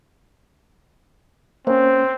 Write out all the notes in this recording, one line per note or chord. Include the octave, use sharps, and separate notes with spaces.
A#3 C4 C#4 C5